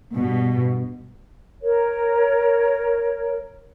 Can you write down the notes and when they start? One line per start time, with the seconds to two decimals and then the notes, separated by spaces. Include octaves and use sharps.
0.13 G2 B2
1.62 A#4 C#5